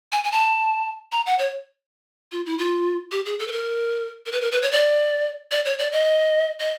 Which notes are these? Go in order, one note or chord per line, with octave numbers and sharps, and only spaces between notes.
G#5
G#5
A5
A#5
F#5
C#5
F4
E4
F4
G4
G#4
A4
B4
A#4
A#4
B4
A#4
B4
C#5
D5
D5
C#5
D5
D#5
D#5